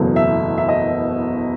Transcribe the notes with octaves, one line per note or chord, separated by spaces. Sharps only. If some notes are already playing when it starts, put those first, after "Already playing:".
Already playing: F#1 E2 B2 F#3 A3
E5
E5
D#5